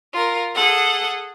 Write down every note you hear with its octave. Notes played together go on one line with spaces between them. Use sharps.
F4 A#4
G#4 A4 F#5